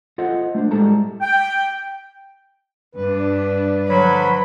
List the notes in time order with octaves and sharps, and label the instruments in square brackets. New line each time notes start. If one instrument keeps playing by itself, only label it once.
[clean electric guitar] F4 A4 C5 D#5 F#5
A3 D4 C5
A2 G3 G#3 A4 A5 A#5
[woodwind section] G5
[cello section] G2 D4 [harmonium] B4
[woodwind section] D3 F3 F#3 [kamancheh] B5